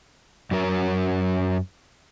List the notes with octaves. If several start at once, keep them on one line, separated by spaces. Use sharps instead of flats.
F#2 F#3 A#4